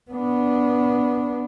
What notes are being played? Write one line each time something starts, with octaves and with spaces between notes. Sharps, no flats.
B3 D4